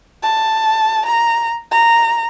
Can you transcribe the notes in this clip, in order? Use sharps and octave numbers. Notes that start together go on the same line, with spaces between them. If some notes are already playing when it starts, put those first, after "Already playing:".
A5
A#5
A#5